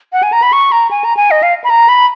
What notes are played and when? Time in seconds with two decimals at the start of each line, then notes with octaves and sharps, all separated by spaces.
0.13 F#5
0.23 G#5
0.32 A#5
0.42 B5
0.53 C#6
0.72 A#5
0.91 G#5
1.04 A#5
1.17 G#5
1.31 D#5
1.43 F5
1.64 B5
1.70 A#5
1.89 B5